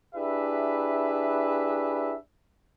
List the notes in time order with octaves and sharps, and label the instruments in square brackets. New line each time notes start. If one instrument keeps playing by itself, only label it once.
[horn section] D4 E4 G4 G#4 B4 E5